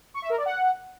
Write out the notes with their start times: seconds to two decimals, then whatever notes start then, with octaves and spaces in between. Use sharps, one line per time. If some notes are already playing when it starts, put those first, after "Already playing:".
0.14 C#6
0.22 E5
0.30 A#4
0.38 D5
0.45 F#5